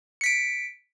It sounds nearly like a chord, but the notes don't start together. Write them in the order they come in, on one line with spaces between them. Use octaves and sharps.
C#7 B6 D7